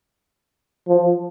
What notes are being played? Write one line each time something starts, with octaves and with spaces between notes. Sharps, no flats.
F3